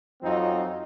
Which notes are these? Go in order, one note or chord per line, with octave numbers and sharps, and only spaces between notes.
F2 F3 F#3 C4 D#4